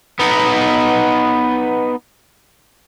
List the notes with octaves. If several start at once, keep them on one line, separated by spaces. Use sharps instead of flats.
B3 D#4